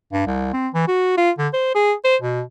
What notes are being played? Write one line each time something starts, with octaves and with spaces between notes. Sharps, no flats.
G2
C2
C4
E3
F#4
F4
D3
C5
G#4
C5
B2